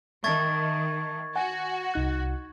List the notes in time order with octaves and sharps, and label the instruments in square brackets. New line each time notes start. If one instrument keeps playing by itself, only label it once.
[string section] D#3 [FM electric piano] E5 A5 [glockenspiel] C#6 G#6 A6
[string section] F#4 [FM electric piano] F#5 G#5
[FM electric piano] C2 D#4 F#6